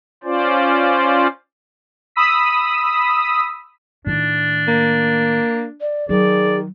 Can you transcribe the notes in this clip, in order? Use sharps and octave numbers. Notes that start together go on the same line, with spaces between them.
C#4 F4 C5 D5
B5 D#6 E6 B6
A2 D#3 D4
A#3
D5
D#3 F#3 G#4 D5